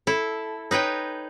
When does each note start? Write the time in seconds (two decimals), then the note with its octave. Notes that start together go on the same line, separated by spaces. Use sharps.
0.07 E4 A4
0.71 D#4 B4 C#5 G5